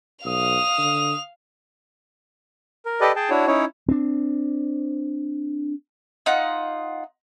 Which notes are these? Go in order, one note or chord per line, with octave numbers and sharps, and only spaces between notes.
B1 F5 D#6 F7
D3
A#4
G4 A4 B4 D5 D#5
G#4 G5 A5
D4 E4 F#4 C#5
C#4 D#4 E4 C#5
C4 D4
D#4 F4 F#5